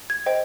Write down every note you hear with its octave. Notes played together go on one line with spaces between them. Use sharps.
G#6
C5 D#5 G5